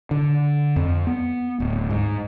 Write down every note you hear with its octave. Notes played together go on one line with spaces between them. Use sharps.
D3
F2
B3
D1
G#2